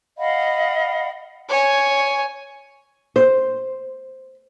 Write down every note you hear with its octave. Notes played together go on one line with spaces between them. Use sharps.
D#5 F5 F#5 B5
C#5 G#5
C5